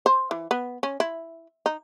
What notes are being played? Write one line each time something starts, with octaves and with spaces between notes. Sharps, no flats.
C5
E3
B3
C#4
E4
D#4